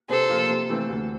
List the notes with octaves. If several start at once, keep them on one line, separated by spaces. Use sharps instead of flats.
C3 A4 C5
F3 A#3 F4
C3
E3 A3 C4
D2